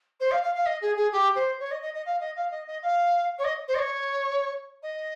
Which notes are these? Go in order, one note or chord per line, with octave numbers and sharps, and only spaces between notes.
C5
F5
F5
F5
D#5
G#4
G#4
G4
C5
C#5
D#5
D#5
D#5
F5
D#5
F5
D#5
D#5
F5
C#5
D#5
C5
D#5
C#5
D#5